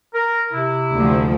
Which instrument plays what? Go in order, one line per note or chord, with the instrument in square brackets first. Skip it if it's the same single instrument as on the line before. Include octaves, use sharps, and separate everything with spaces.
[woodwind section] A#4
C3 E4
[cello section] D2 F3